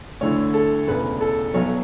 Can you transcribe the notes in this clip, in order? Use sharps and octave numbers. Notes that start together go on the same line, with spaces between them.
D2 D3 A3 E4 C#5
A4
E1 D2 C#3 B4
A4
B1 B2 F#3 C#5